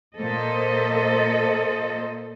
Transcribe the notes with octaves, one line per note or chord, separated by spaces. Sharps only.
A#2 A#3 A4 C5 D#5